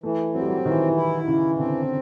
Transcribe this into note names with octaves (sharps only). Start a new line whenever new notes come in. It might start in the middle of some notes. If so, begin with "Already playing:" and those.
E3 A3
F#3 C4
G3
F#3
D#3 E3
E4
C#3 E3
D3 C4